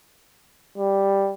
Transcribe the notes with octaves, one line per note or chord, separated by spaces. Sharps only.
G3